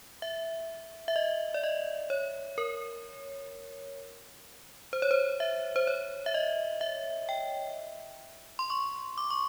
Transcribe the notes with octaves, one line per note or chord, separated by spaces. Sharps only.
E5
E5
D#5
D5
D#5
C#5
A#4
C5
C#5
C5
E5
C5
C#5
E5
D#5
E5
G5
C6
C#6
D6
C#6